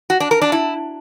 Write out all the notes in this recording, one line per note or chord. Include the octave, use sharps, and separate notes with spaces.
F#4
D4
A#4
D4
E4